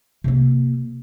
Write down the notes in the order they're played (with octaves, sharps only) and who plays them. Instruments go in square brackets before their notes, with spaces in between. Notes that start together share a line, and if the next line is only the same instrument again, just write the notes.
[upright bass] C3 A#3